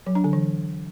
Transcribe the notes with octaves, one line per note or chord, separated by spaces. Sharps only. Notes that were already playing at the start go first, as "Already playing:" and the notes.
F#3
D4
D3
E3